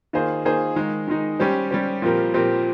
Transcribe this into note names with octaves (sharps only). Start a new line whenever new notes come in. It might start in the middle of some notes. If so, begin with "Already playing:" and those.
D#3 A#3 F4 G#4 C5
D#3 A#3 F4 G#4 C5
D#3 G#3 D#4
D#3 G#3 D#4
G3 C#4 G4 C5
G3 C#4 G4 C5
A#2 F3 C4 G4 A#4
A#2 F3 C4 G4 A#4